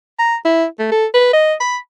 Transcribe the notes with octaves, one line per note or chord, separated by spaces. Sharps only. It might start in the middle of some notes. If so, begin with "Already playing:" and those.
A#5
E4
A3
A4
B4
D#5
B5